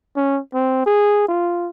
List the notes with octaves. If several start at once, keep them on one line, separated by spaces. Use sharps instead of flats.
C#4
C4
G#4
F4